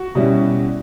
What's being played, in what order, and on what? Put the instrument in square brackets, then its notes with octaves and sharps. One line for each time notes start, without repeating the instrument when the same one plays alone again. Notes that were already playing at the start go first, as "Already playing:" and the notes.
Already playing: [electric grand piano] F#4
[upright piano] B2 G3 C#4 E4